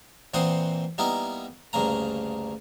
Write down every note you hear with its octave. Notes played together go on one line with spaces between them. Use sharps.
A#2 E3 C4 C5 F#5 D#6
G3 A#3 B3 D#4 E4
D2 G2 C#3 A#3 A#5